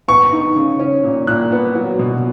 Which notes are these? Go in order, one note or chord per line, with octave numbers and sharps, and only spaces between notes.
B3 C#6
D#4
C#3
C#4
A#2
A#2 F#6
B3
F#3
B2